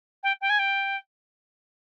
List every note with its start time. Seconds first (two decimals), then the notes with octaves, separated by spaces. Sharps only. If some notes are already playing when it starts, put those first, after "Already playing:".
0.23 G5
0.41 G5
0.49 G#5
0.59 G5